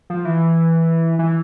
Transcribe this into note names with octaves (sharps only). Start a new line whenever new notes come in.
F3
E3
E3